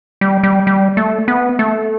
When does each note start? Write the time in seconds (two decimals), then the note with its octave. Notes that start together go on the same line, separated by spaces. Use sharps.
0.21 G3
0.43 G3
0.67 G3
0.97 A3
1.28 B3
1.59 A3